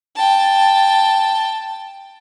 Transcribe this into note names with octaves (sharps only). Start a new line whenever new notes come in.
G5 A5